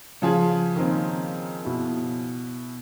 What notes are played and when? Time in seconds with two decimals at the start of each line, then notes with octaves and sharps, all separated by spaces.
0.22 C#3 F3 G#4
0.76 D#3 A#3 C4
1.65 B2 E4